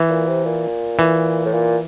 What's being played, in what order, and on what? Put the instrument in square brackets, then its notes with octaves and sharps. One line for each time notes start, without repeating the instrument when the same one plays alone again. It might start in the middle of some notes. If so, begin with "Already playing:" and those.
Already playing: [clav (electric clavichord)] E3
[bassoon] A#2
C3
A#2
[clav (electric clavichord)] E3
[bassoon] A2
A#2